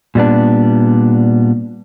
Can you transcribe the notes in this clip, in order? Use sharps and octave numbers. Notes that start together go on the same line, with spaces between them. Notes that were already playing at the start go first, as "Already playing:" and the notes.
A#2 G3 B3 D4